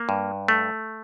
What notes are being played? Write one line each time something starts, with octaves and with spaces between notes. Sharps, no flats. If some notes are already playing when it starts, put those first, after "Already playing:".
Already playing: A#3
G2
A3